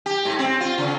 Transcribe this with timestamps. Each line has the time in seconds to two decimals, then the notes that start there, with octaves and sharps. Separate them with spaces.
0.06 G4
0.25 G#2
0.39 C4
0.61 F4
0.78 C#3